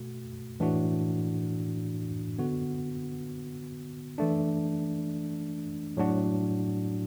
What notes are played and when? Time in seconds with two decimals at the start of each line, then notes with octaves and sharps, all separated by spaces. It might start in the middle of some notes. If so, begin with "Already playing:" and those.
Already playing: B2 A3 F#4
0.60 A2 E3 D4 F#4
2.39 D3 B3 F#4
4.18 E3 A3 D4
5.97 A2 F#3 D4 F#4